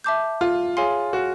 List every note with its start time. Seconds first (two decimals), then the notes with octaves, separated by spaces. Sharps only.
0.04 E5 A5 D6 G6
0.41 F4
0.77 G#4 C#5 F5 G#5 C6
1.13 F#4